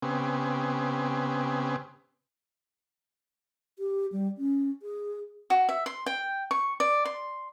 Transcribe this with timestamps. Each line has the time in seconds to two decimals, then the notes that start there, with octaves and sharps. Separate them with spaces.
0.02 C#3 B3 C4 G4 G#5
3.79 G4
4.12 G3
4.38 C#4
4.82 G#4
5.50 F#4
5.69 E5
5.86 C6
6.06 G5
6.51 C#6
6.80 D5
7.05 C6